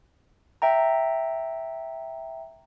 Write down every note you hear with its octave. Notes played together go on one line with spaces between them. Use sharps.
E5 G5 A#5